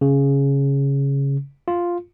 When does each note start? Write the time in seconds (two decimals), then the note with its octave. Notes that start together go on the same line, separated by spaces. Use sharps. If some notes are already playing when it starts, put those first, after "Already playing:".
0.01 C#3
1.68 F4